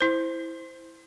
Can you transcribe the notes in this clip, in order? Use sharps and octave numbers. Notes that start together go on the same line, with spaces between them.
E4 C5